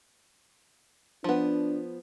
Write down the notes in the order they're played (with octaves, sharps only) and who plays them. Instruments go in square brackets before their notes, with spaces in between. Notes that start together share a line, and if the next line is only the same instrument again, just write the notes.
[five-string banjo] F3 B3 [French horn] D4